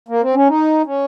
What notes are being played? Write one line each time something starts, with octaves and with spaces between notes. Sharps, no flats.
A#3
C4
C#4
D#4
C#4